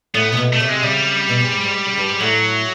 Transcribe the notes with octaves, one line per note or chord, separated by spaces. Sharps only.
A2 B3
C3
B2
A3
C3
G#3
C#3 G3
B2
G#2
G#2
G#2
C#3
G2
G#2
A2 F#3